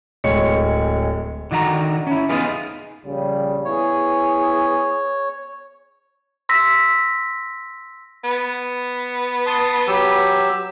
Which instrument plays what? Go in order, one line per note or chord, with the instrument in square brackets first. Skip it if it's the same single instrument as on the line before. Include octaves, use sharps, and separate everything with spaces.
[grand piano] D1 G#3 C#5 C#7
[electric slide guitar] D3 D#3 F#4 E5 A#5
C#4 E4
B3 D#4 F4 G#4 B4
[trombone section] A#1 C#3 G3
[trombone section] B3 E4 G#4 [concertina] C#5
[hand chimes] C6 E6 A#6 B6
[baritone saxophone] B3
[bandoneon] A5 C6 D#6
F#3 G4 E6